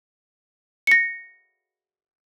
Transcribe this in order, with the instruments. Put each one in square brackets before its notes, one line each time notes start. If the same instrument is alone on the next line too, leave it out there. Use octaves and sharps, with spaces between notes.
[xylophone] A#6 C#7